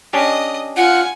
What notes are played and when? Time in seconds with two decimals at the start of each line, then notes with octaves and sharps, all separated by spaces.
0.13 C#4 D4 G4 D#5 D#6
0.77 F4 F#5 G#5